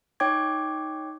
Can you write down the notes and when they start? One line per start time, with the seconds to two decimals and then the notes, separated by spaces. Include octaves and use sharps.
0.20 D#4 C#5 G5 D6 G#6